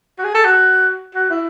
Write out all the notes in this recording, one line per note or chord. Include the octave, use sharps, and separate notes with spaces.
F#4
G#4
A4
F#4
F#4
E4